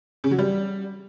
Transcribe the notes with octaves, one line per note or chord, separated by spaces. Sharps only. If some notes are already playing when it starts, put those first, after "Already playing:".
C#3
F#3
G3